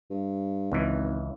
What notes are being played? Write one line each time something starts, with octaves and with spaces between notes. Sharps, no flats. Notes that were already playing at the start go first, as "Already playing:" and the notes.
G2
G#1 C#2 E3